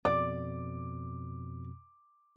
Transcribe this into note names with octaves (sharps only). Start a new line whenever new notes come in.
F2 B2 D5 D6